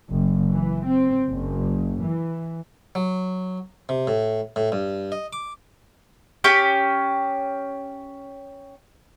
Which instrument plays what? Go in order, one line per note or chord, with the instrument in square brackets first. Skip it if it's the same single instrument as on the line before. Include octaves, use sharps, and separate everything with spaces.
[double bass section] F#1
E3
C4
F#1
E3
[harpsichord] F#3
C3
A2
A2
G2
D#5
D6
[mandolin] C#4 G4 G5 G6